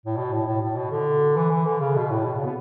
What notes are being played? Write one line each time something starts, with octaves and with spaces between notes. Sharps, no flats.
A2
B2
A2
A2
A2
B2
D3
E3
E3
D3
C#3
B2
A2
B2
C#3
B3